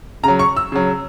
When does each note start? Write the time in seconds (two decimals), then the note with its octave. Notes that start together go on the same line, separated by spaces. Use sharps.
0.23 C#3 A#5
0.28 F#3
0.39 C#6
0.57 E6
0.72 C#3 F#3